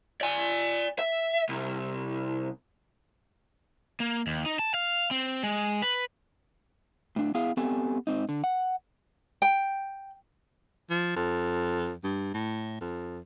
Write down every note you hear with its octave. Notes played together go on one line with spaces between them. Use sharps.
D5 G#5
E5
C2
A#3
D#2
D#4
A5
F5
C4
G#3
B4
A2 D4
B3 E4 G#4 F5
B3 C4 G4 A4 G#5
G#2 C4 D#4
D3
F#5
G5
F3
F2
G2
A2
F2